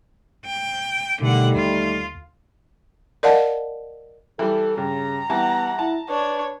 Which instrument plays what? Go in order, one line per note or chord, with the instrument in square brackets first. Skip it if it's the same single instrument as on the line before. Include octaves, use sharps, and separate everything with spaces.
[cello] G5
[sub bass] B2 [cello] D3 F#5 [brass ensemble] D#3 G3 A3
[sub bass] D#2 [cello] F4
[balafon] A#4 D5 D#5 F5 F#5 A5
[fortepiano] E3 G3 [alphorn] A4
[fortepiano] G2 [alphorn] C#3 [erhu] A#5
[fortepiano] E3 G3 A5 [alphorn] B3 [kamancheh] F#5
[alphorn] E4 [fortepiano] A5
[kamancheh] D4 C#5 [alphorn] B4